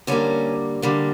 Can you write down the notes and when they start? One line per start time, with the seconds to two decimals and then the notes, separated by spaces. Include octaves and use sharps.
0.07 D3 G3 A#3 C#4
0.82 D3 G3 A#3